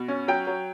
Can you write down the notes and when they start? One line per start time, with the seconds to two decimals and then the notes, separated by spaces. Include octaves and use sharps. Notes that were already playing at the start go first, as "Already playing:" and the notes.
Already playing: B2
0.08 C#4
0.28 F#3 G5
0.47 F#3